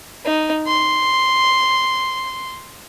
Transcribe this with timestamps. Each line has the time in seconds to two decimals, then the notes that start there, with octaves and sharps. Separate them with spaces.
0.25 D#4
0.67 C6